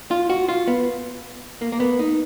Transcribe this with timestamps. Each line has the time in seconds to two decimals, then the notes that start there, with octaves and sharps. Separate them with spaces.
0.11 F4
0.30 F#4
0.49 F4
0.68 B3
1.61 A#3
1.72 A#3
1.80 B3
1.99 D#4